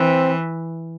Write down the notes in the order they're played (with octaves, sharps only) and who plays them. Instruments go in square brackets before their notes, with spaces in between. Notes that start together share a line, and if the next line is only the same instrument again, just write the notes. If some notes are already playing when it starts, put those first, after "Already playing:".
Already playing: [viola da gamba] E3 [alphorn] C4